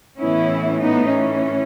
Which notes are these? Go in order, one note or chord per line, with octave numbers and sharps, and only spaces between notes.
A2 E3 B3 C#4 E4
B3 D#4
C#4